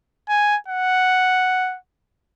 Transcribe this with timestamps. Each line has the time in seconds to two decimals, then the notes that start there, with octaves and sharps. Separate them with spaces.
0.29 G#5
0.68 F#5